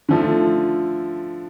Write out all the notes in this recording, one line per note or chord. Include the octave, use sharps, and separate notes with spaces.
D3 F3 A3